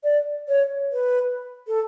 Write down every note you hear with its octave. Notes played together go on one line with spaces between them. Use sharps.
D5
C#5
B4
A4